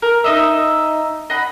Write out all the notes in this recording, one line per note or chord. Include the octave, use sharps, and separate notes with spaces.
A#4
D#4 D#5 E5
D#5 F#5 B5